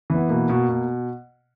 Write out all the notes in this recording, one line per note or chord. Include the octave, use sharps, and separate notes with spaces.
E3 B3
B2 A#3
B2
B2